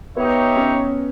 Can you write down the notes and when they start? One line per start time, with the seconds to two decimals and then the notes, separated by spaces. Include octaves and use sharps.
0.16 B3 D#4 G4 C#5 E5
0.57 C#4